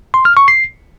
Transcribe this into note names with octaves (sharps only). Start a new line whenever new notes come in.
C6
F6
C#6
C7